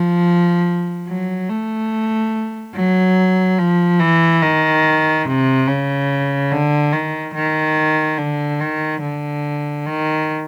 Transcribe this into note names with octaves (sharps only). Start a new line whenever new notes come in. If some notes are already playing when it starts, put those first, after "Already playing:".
Already playing: F3
F#3
A3
F#3
F3
E3
D#3
C3
C#3
D3
D#3
D#3
D3
D#3
D3
D#3